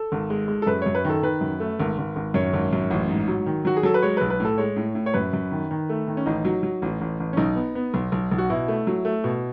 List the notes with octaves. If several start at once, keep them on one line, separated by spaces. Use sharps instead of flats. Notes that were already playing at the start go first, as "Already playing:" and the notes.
Already playing: A4
G#1
G#3
G#3
A4
F#2 B4
F#2 C#5
B4
D#3
A4
D#3 B4
F#2
A3
G#1
G#1
G#1
F#2 C#5
G#1
F#2
A1
G#2
F#3
D#3
F#3 F#4
G#4
F#3 A4
B4
G#3 C#5
B4
B1
B4
A2
A4
G#3 C#5
A2
A2
C#5
F#2 B4
F#2
D#3
D#3
A3
D#3
C#4
A1 D#4
F#3
F#3
A1
A1
A1
C#4
B1 D#4
B3
B3
B1
B1
B1
F#4
B2 E4
A3
F#3
A3
B2